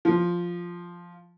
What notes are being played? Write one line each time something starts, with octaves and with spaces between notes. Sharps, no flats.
F3